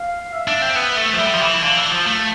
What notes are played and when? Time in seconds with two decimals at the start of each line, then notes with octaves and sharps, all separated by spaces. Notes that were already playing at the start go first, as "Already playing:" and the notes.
Already playing: F5
0.33 E5
0.48 D4
0.62 C4
0.76 B3
0.97 A3
1.13 F3
1.19 G3
1.33 F3
1.41 E3
1.63 D3 F5
1.77 E3
1.91 F3
2.06 A3